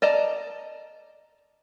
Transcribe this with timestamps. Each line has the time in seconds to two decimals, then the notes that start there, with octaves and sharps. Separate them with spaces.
0.02 D5 D#5 A5 A#5